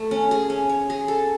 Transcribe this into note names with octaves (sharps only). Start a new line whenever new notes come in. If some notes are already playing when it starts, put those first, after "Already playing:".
Already playing: A3
C#4
G#4
C#4
C#5
G#4
A4